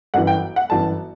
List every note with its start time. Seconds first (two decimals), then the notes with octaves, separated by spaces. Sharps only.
0.14 G1 F#2 E3 F#5
0.27 G5
0.56 F#5
0.70 G1 F#2 E3 A5